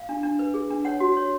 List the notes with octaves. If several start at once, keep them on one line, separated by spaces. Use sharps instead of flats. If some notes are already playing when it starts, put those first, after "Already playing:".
Already playing: F5
D4
D4
B4
G#4
D4
C#5 F#5
F#4
C#5